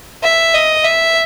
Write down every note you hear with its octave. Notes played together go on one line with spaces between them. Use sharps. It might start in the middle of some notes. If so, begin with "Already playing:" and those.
E5
D#5
E5